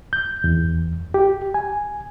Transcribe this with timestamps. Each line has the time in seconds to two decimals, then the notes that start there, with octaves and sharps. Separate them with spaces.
0.13 G6
0.44 E2
1.14 G4
1.54 G#5